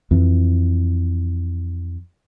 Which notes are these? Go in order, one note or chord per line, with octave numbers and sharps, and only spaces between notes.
F2 E3